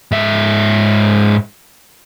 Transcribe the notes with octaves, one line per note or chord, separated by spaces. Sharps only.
G#2 E5